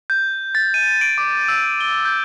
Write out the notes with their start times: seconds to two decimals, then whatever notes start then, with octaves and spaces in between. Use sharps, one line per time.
0.10 G6
0.55 A6
0.74 D#7
1.01 D7
1.18 D6
1.48 E6
1.80 G7
2.05 G6